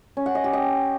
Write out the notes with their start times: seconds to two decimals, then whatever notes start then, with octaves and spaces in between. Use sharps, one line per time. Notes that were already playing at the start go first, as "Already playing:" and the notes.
0.17 C#4
0.26 F#5
0.35 D#5
0.44 G4
0.53 D#5